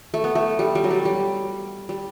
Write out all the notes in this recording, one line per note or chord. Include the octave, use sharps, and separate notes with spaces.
A3
B3
A3
G3
G3
F#3
G3
G3
G3